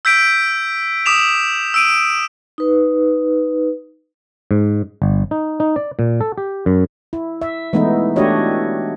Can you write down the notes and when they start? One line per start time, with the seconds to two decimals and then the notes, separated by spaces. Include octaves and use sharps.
0.05 E6 G6 B6 D7
1.06 D6 D#6 B6 E7 F7
1.74 E6 D7 D#7
2.58 D#4 B4
4.51 G#2
5.02 G1
5.31 D#4
5.60 D#4
5.76 D5
5.99 A#2
6.21 A4
6.38 G4
6.66 F#2
7.13 E4
7.42 E5
7.73 E3 G#3 A3 B3 D#4 E4
8.16 A3 D4 F#4 G4 C#5 D#5